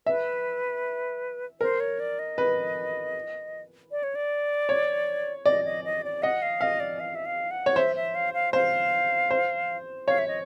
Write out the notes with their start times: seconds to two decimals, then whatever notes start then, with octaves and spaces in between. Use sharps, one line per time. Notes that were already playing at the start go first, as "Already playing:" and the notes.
0.06 B4 E5
1.61 A#4 C5
1.80 C#5
2.00 D5
2.19 D#5
2.38 B4
3.91 D5
4.03 C#5
4.15 D5
4.69 C#5
5.46 D5 D#5
5.65 D#5
5.84 D#5
6.04 D5
6.23 D#5 F#5
6.42 F5
6.61 D#5 F5
6.80 D5
7.00 F5
7.15 E5
7.26 F5
7.51 F#5
7.66 C#5
7.76 C5 E5
7.96 E5
8.15 F5
8.34 F5
8.53 C5 F5
9.31 C5
10.08 C#5 F5
10.18 E5
10.28 D#5